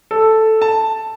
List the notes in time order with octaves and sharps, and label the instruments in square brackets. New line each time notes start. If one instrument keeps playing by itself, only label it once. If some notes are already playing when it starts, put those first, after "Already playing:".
[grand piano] A4
A5